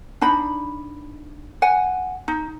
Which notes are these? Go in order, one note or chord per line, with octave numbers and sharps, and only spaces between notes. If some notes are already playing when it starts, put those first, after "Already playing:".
D4 D#4 B5
F#5 G#5
D#4